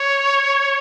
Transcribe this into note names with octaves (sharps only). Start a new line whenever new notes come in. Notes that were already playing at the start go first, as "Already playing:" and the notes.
Already playing: C#5